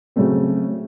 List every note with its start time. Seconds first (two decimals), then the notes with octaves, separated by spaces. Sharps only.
0.16 C#3 F#3 A3 C4